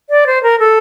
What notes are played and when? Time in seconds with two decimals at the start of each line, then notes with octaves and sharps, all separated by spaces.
0.10 D5
0.27 C5
0.43 A#4
0.60 A4